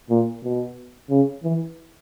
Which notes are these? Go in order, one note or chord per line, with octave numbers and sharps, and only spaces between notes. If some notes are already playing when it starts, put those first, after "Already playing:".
A#2
B2
C#3
E3